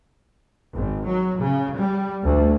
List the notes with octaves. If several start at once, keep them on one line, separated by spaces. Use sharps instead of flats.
G#1
F#3
C#3
G3
D2